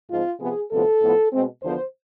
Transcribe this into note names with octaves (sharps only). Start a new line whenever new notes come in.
G#2 F3 G#3 C4 F4
C3 F3 B3 G#4
D2 C3 F3 B3 A4
A2 F3 B3
B2 G#3 C4
E2 D3 F3 B3 C5